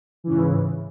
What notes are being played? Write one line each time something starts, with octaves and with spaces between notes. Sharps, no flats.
G#2 C#3 E3